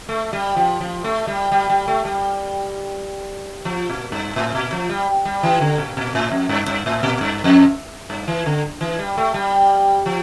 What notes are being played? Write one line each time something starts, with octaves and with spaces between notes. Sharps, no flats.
A3
G3
F3
F3
A3
G3
G3
G3
A3
G3
F3
A#2
G2
A2
A#2
F3
G3
G3
E3
D3
A#2
A#2
A2
F2
G2
G2
A2
A#2
G2
F2
G2
E3
D3
E3
G3
A3
G3
F3